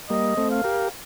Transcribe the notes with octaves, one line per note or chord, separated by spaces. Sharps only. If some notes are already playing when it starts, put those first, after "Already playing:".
G3 A#3 D#5
A3 C4
F5
G4 A#4